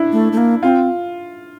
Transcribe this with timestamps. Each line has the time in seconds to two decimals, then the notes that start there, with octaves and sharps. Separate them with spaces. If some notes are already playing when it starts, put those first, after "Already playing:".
Already playing: D4 E4
0.12 A3
0.32 A3
0.37 A#3
0.63 C4 F4